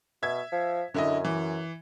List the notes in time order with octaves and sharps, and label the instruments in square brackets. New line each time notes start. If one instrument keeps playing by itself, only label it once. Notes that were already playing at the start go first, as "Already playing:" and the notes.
[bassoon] B2 [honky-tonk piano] E5 G#6
[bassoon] F3
[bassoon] F#2 [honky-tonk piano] D3 E4 D#5
[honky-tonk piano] E3